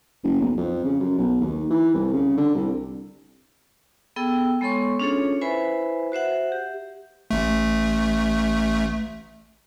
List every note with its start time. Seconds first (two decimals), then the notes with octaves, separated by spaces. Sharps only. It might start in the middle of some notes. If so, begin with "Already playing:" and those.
0.23 F#1
0.40 B1
0.57 F2
0.84 C#3
1.00 F#2
1.18 B1
1.40 D#2
1.70 E3
1.94 C2
2.13 C#3
2.37 D3
2.55 C2
4.16 B3 G#4 A4 G5 E6
4.61 G#3 B3 A4 C#5 C6 C#6
5.00 C#4 D4 F4 G#4 A4 C#5
5.41 E4 B4 C5 E5 G#5 B5
6.12 F#4 C5 E5 F#5
6.52 G4
7.31 A1 A3